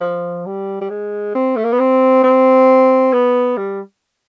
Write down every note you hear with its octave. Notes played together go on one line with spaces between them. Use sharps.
F3
G3
G3
G#3
C4
A3
A#3
B3
C4
C4
B3
G3